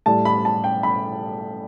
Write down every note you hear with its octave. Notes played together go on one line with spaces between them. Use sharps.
A2 G3 A5
B5
A5
G5
B5